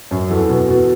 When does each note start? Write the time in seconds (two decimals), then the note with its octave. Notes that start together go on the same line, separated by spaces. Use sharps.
0.11 F#2
0.30 E2 A4
0.49 B2
0.69 B2